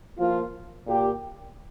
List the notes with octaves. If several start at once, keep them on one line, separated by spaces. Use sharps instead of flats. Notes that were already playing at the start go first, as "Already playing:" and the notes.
F3 A#3 F4
A#2 A#3 G4